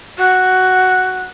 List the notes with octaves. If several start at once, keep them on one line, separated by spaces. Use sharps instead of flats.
F#4